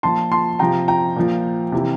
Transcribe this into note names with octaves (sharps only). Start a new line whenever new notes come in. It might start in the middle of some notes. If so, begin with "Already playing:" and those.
A#2 F3 A5 C6
A5 C6
C3 F3 G5 A#5
G5 A#5
A#2 F3
C3 E3